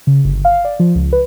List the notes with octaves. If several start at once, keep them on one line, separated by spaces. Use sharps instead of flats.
C#3
G1
F5
D5
F3
C#2
B4